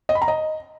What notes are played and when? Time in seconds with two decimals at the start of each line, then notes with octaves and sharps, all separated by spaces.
0.09 D#5
0.15 B5
0.22 A#5
0.28 D#5